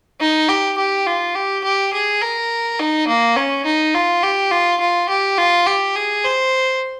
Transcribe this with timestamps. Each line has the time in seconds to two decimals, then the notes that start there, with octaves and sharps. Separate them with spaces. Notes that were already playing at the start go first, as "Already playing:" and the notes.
0.20 D#4
0.49 G4
0.78 G4
1.06 F4
1.35 G4
1.64 G4
1.93 G#4
2.22 A#4
2.80 D#4
3.08 A#3
3.36 C#4
3.66 D#4
3.94 F4
4.23 G4
4.52 F4
4.80 F4
5.09 G4
5.38 F4
5.67 G4
5.96 G#4
6.24 C5